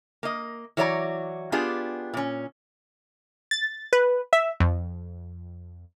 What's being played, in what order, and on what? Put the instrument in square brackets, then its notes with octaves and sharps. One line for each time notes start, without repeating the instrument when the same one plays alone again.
[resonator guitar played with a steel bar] A#3 D#5
E3 F#3 C#5 D5 A#5
B3 D4 F4 G4 G#4
A#2 C#4
[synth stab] A6
B4
E5
F2